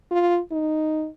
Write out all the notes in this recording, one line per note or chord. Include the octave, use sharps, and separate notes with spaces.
F4
D#4